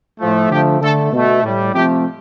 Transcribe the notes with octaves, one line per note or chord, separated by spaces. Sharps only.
A2 F3 A3
D3 F3 A3 G4
D3 A3 A4
B2 A3
A2 G3
C3 F3 A3 G4